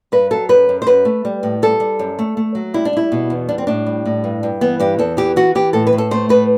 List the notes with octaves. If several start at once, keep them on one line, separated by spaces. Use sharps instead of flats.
G2 B4
F#3 A4
F#2 B4
F#2
C5
F#2 B4
A3
G3
A2
G3 A4
G3
F#2
A3
A3
F#3
G3 E4
D4
G3 E4
B2
E2
G3 D4
C4
A2 D4
G3
A2
G2
G2
E3 B3
G2 G4
E2 A4
E3 G4
E3 F#4
E3 G4
A2 A4
B4
A2
A4
A3 C5
A2 B4